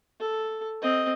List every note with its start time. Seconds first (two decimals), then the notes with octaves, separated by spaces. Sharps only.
0.20 A4
0.82 C4 D#5